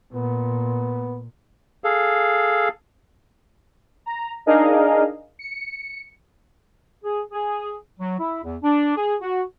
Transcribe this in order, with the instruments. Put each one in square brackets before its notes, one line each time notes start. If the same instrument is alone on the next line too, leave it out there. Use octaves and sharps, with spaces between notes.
[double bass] A#2 [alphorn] B3
[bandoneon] G#4 A4 F5
[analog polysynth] A#5
D4 D#4 G#4 A#4 D#5 F5
C#7
[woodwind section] G#4
G#4
F#3
E4
E2
D4
G#4
F#4